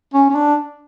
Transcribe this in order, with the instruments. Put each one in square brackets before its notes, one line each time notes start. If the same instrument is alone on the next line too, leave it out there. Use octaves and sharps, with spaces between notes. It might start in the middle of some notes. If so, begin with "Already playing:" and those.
[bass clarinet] C#4
C#4
D4